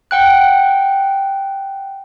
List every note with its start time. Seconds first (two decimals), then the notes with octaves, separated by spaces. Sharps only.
0.11 F#5 G5 F#6